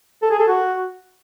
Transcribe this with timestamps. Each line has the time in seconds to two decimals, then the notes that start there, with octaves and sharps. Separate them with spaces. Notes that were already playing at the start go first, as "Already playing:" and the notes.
0.23 A4
0.31 G#4
0.40 A4
0.48 F#4